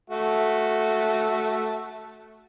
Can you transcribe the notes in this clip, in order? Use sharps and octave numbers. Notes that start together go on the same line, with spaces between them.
A3 F#4 E5